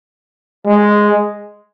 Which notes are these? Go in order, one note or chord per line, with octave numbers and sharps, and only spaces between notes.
G#3